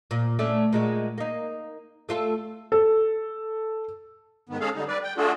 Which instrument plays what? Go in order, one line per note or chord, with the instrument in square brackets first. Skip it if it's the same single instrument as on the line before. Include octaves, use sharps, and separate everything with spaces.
[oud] A#2
A3 C#4 D4
A#2 G#3 F#4
A#3 D#4
A3 F4 A4
[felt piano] A4
[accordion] G#2 D#3 B3
G#3 C#4 G#4 A4 F5
D3 G3 D#4
G3 B4 D5
G5
A3 D4 F4 F#4 G#4 A4